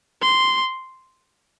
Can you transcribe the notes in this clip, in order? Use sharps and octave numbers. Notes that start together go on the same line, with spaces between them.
C6